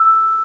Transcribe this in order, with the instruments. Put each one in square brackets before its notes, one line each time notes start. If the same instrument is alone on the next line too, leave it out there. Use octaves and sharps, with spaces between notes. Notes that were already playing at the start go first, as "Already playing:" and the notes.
Already playing: [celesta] E6